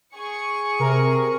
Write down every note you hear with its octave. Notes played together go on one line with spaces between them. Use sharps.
G#4 C#6 C#7
C3 A#4